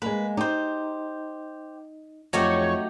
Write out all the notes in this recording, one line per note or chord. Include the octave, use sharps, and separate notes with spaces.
G#3 A#3 B4
D#4 G4 C5
F2 F#3 A3 D#4 F#4 G4 C#5